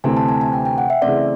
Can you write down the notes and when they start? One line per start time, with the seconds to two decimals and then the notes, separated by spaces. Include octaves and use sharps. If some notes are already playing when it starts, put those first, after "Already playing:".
0.04 D2 C3 E3 A3 C4 G#5
0.17 A5
0.28 G#5
0.41 G#5
0.53 G5
0.65 G5
0.78 F#5
0.90 E5
1.02 C#3 E3 A3 C4 D5